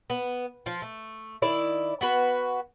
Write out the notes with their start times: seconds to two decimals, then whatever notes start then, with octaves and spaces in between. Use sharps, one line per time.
0.10 B3
0.66 F3 F4
0.82 A3
1.42 D#3 E4 D5
2.01 B3 F#4 B4